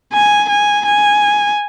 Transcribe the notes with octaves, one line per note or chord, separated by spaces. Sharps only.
G#5
G#5
G#5